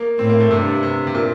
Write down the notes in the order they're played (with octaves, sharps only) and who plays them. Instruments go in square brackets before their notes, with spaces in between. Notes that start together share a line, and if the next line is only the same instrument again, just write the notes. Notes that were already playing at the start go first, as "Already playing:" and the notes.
Already playing: [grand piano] A#3
[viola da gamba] A2 [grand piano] C4
[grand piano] A#3
A3
[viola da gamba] G2 [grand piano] C3
[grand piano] C3
C3
A#2